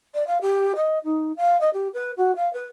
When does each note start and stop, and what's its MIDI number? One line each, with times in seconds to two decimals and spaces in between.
0.14 0.26 74
0.27 0.38 77
0.41 0.73 67
0.76 0.98 75
1.04 1.32 63
1.36 1.59 77
1.60 1.70 75
1.73 1.88 67
1.93 2.11 71
2.17 2.35 66
2.36 2.51 77
2.53 2.66 71